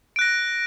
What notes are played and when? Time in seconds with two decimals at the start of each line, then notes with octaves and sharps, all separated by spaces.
0.16 D7
0.19 F#6
0.21 A#6